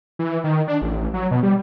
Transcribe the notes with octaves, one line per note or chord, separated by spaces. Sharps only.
E3
D#3
D4
A1
F#3
B2
G3